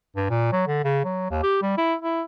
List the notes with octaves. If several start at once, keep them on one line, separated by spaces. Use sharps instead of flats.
G2
A#2
F#3
D3
C#3
F#3
D#2
G4
G3
E4
E4